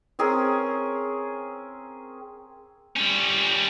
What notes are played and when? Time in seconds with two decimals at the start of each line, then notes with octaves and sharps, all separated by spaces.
0.19 C4 C#4 G#4 A#4
2.96 G3 C#4